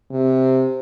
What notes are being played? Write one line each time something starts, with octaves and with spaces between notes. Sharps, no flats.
C3